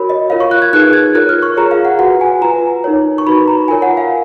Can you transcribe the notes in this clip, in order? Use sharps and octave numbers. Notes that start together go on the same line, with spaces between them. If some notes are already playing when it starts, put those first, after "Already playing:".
Already playing: F#4 A#4 C#5 B5
D#5
F4 A#4 C#5 F5
C#6
F#6
G#6
D#4 G#4 B4 F#6
G#6
F4 A#4 C#5 F#6
F6
C#6
F4 G#4 C#5 A#5
F5
F#5
F#4 B4 F#5
G#5
F4 B4 A#5
D#4 A#4 C#5
C#6
D#4 F#4 B4 B5
A#5
F4 A#4 C#5 G#5
F#5
F5